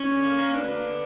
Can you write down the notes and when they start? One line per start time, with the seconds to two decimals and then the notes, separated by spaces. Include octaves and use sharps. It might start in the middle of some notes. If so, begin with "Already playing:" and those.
Already playing: C#4
0.08 D3
0.24 A#3
0.39 A#3
0.53 D2 B3 D4
0.69 A#3
0.84 D3